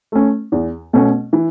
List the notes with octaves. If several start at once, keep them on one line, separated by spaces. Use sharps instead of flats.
A3 C#4
E2
B2 A3 C#4
E3